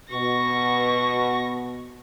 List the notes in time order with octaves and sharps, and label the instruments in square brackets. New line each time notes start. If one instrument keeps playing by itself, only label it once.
[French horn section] B2 [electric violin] C#6 A#6